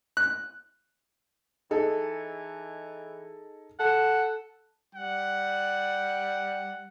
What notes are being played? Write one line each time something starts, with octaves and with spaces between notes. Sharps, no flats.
F#6
E3 D#4 G#4 A4
A4 F#5
G3 F#5